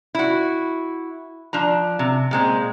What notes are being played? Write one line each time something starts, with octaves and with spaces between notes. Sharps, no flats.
E4 F#4
F3 D4 A#5
C3
A#2 G#3 C4